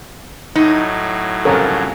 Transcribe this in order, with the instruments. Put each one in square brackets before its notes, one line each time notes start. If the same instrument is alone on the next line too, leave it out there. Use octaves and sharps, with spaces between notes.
[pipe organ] A2 F#3 [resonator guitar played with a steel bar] D#4
[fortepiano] C2 F2 C#3 [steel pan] A4 A#4 C#5